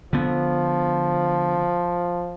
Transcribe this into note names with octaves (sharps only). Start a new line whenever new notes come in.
D3 F3 B3